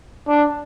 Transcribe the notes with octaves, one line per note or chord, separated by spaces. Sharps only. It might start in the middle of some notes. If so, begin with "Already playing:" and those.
D4